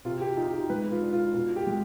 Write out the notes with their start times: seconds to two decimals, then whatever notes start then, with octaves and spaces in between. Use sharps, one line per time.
0.05 C3 F4
0.21 G4
0.37 D#4 F4
0.53 G4
0.70 G#3 B4
0.91 F4
1.02 D4
1.13 F4
1.34 B2 F4
1.56 G4
1.67 G#3